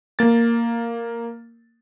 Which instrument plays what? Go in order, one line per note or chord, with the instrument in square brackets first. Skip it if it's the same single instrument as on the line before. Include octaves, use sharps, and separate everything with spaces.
[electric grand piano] A#3 A6